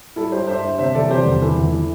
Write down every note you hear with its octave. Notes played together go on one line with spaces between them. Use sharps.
G3 E4 A4
G3 G4 C5
G2 C5 E5
G3
C3 C5 E5
E3 A4 D5
C3 G4 C5
E2
E3 E4 A4
E2
E3 E4